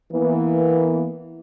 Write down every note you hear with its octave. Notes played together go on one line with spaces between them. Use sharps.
E3 A#3 B3